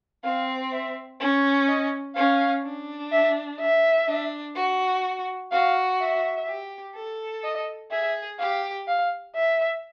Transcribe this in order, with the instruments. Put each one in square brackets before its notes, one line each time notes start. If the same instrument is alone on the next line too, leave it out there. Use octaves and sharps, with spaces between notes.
[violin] C4 [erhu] F5
[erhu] E5
[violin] C#4
[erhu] D#5
[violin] C#4 [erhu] F5
[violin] D4
[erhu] E5
E5
[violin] D4
F#4
[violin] F#4 [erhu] F5
[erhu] E5
[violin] G4
A4
[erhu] D#5
[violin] G#4 [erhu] E5
[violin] G4 [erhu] F5
[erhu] F5
E5